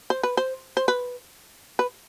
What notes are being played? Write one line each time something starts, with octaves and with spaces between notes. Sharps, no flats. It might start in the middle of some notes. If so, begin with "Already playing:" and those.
C5
B4
C5
C5
B4
B4